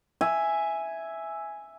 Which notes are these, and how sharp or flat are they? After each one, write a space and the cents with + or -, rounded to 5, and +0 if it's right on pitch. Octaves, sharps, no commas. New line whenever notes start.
E5 +0 G#5 +0